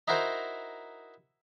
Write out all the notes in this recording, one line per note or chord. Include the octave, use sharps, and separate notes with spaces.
D#4 E4 F#4 A#4 C5